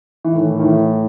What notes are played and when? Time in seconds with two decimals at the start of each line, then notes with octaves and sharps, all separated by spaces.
0.25 E3
0.33 A2 D#3
0.59 D#3
0.64 E3